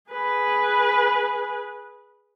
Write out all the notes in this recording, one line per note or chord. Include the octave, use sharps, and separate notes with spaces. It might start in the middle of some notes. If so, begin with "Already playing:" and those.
G#4 B4